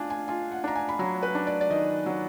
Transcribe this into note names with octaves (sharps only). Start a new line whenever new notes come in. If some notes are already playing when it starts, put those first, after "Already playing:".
Already playing: D4 F4 G#5
G#5
F4 G#5
F#5
D4 A#5
G#5
B5
F#3 A#5
B4
D4
D5
D5
D#3 D#5
F#3